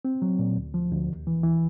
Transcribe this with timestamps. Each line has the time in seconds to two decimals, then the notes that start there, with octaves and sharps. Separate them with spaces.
0.05 C4
0.22 F#3
0.39 A#2
0.57 D2
0.74 F3
0.92 D2
1.09 D#2
1.27 E3
1.43 E3